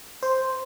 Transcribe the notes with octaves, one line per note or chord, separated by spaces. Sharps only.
C5